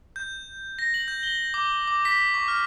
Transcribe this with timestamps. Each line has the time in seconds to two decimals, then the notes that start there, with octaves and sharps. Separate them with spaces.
0.16 G6
0.79 A#6
0.94 F#7
1.08 G6
1.23 G7
1.54 D6
1.88 D6
2.05 B6
2.34 C#6
2.48 F6